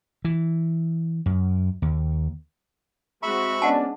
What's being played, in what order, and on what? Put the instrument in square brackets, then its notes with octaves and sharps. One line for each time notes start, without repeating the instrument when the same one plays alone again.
[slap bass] E3
F#2
D#2
[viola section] G#3 C4 F#4 [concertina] E5 B5 C#6 [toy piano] A#5
[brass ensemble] B3 C#4 D4 [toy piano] D#5 F#5 A5